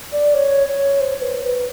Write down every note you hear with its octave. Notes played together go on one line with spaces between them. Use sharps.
D5
C#5
C#5
C5
B4
B4